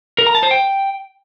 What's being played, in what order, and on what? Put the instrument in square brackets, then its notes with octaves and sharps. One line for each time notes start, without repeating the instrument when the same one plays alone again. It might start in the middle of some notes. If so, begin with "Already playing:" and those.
[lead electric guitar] A#4
A#5
A5
C5
G5